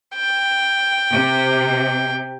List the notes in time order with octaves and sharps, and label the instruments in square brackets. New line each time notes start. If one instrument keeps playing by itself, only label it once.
[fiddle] G5
[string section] C3